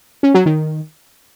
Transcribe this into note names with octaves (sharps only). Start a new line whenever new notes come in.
C#4
F#3
D#3